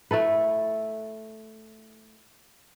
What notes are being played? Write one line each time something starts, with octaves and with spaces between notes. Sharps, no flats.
A3 E4 A4 B4